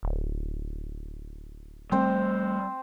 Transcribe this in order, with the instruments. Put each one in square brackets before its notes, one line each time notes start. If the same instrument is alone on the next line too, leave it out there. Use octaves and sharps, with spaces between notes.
[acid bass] D1
[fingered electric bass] G3 A3 [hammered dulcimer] C4 C5